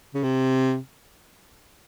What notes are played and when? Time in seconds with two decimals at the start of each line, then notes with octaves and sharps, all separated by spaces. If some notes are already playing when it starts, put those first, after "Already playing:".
0.14 C#3
0.23 C3